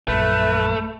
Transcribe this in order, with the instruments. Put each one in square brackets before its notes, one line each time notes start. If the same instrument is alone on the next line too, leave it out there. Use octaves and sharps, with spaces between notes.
[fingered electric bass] A#1 F#2 [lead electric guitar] A3 [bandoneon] B4